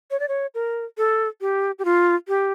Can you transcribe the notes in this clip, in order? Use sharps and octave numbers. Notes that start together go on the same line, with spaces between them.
C#5
D5
C#5
A#4
A4
G4
G4
F4
G4